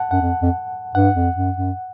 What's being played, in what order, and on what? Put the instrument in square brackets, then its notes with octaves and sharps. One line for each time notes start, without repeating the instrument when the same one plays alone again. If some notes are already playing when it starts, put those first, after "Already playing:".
Already playing: [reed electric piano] F#5 A5
[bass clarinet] F#2 [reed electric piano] F#5
[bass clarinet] F2
F2
[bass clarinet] G2 [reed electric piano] F#5
[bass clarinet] F2
F#2
F#2